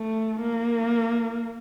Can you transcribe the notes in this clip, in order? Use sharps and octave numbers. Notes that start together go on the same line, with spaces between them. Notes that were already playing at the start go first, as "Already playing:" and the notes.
Already playing: A3
A#3